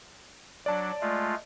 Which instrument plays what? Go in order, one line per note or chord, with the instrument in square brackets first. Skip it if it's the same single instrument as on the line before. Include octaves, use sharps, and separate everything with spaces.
[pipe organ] F#3 D4 [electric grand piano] D5 A5
[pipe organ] G#3 A3 F4